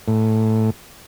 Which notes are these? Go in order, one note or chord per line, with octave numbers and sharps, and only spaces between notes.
A2